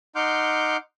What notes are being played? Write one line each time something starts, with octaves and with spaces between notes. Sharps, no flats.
D#4 F#5 C6 D6 F6 G6